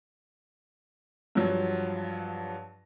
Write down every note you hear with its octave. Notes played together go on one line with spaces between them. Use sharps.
G2 F3 F#3